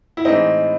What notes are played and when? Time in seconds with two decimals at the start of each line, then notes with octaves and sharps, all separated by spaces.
0.17 E4
0.25 A2 E3 G#3 C4 D#4